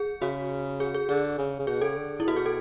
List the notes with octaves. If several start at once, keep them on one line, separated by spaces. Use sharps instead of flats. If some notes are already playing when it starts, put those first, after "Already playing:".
Already playing: G#4
C#3 F#4
G#4
G#4
D3 G#4
C#3
C#3
B2 G#4
C#3 A4
D3
E4
B2 F#4
G#4
A4